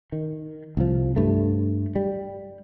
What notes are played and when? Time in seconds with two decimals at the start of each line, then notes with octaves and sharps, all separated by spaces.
0.12 D#3
0.77 C2 F3
1.16 G2 A3
1.96 G3